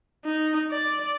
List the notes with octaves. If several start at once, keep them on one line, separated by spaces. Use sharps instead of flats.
D#4
D5